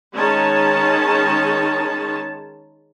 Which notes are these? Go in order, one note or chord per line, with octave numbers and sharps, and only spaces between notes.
D#3 G#3 C#4 D#4 C#5 A5